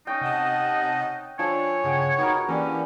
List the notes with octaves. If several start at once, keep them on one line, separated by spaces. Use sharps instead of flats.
C#4 D#4 G5
C3 D#5 F#5 A5
F3 D4 A4 C#5 G#5
G2 C#3 G#4 F#5 G5
B3 D#4 F4 F#4 A#4
E3 A#3 C#4 D4 G4 B4